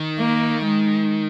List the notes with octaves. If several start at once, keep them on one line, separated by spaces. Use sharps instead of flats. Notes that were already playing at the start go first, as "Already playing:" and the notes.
Already playing: D#3
A#3
G#3